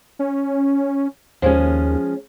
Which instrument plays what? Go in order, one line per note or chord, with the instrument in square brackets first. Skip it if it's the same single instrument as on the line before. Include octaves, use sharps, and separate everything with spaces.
[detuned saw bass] C#4
[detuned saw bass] D#2 [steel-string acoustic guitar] F3 G#3 C#4